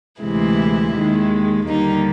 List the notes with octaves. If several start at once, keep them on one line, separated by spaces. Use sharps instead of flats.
D2 C3 E3 G#3 E4
D#2 D#3 G#3
D#2 D3 G3 A#3 D#4